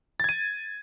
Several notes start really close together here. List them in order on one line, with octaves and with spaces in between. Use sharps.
A6 G#6 D#7